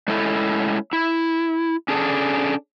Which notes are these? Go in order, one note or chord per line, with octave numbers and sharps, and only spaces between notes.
G#3 A3 C#4 E4 A4
E4
C#4 D4 G#4 A4